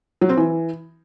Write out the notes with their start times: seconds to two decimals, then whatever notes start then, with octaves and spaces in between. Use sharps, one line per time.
0.21 F#3
0.29 C4
0.37 E3